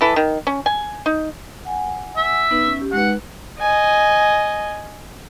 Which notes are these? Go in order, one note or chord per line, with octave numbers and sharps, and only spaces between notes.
E3 E4 A4
D#3
C#4
G#5
D#4
F#5 G#5
E5
B3 D#4 B4
C#4
G4
G#3 D#4 B4 F#5
D#5 G#5